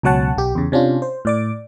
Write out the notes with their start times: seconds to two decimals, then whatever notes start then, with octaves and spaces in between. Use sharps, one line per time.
0.03 C#2 B2 F#3 C#5 F#5 A5
0.36 B1 G4
0.55 E2 C#3
0.72 C3 C#4 D4 F4
1.02 C5
1.25 A2 D5 D6